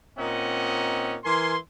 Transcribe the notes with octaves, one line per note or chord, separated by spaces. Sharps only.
A#2 C4 C#4 D#4 D#5 F#5
E3 A#4 G#5 C6